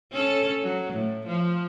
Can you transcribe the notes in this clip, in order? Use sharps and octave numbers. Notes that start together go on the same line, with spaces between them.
C#4 A4
F#3
A2
F3